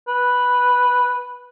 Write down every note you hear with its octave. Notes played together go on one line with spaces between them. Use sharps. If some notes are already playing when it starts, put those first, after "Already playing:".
B4